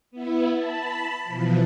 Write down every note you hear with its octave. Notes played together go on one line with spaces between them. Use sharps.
B3 E4
A5 B5
B2 E3 F3